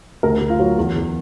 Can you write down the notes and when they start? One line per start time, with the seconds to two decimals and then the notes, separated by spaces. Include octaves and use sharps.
0.23 D2 A#4
0.41 D2
0.50 F4
0.60 F#3
0.77 E2
0.95 E2